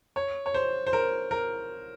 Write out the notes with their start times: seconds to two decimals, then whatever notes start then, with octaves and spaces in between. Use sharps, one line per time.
0.16 C#5
0.46 C#5
0.54 C5
0.87 C5
0.93 A#4
1.31 A#4